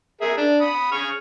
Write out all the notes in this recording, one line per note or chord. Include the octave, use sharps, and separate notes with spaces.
G#4 A#4 E5
D4
B5 D#6
G#4 C#6 F6